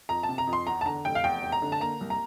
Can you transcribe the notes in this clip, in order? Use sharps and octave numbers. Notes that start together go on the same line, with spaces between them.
F2 A#5
A5
C3
A#5
F2
C6
E2 A#5
A5
D3 A#5
F1 G5
F5
E2 G5
F1
A#5
D3
A5
A#3 A#5
C2
A#5